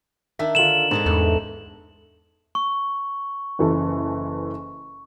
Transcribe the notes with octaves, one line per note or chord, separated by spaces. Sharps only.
D#3 D4 E5
D3 F4 E7 F#7
G#2 D3 C4 A4
E2 A3
C#6
F#1 E3 A4